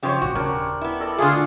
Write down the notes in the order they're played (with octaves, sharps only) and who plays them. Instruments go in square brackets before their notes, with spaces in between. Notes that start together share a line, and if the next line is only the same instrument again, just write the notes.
[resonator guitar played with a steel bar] F#2 C#3 F3 [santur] G4 C5 C#5
[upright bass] A#1 [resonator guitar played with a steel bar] F#4
[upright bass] D#1 [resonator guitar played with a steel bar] C#3 [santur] D4 A#4
[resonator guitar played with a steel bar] B3 E4
[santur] A4 D5 D#5
[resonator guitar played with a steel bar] D3 A3 [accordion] F4 G#4